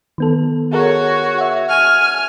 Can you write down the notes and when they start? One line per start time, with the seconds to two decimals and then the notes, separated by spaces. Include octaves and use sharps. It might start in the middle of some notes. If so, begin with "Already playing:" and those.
0.18 D#3 B3 A4
0.73 F#4 G#4 A#4 C#5
1.38 E5 F#5
1.69 G#5 F6